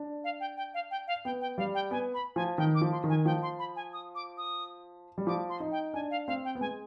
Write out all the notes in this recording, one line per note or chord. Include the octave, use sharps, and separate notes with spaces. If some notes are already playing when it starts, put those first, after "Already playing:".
Already playing: D4
F5
G5
G5
F5
G5
F5
B3 G5
G5
G3 F5
G5
B3 G#5
B5
F3 G#5
D#3 G5
D6
F3
C6
D#3
G#5
F3 G5
C6
B5
G#5
D#6
D6
D#6
G3
F3 D6
C6
D#4
G5
D4 G#5
F5
C4 F5
G5
B3
G#3 G#5